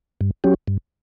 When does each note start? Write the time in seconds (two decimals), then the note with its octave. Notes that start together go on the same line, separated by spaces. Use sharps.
0.21 G2
0.44 F#3 C#4 G4
0.68 G2